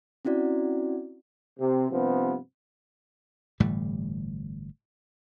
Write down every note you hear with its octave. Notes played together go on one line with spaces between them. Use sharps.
C4 C#4 E4 F#4 D5
C3
G2 C3 F3 B3
G1 A2 E3 G3